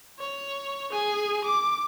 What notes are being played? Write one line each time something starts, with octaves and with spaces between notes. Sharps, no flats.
C#5
G#4 G#5
D6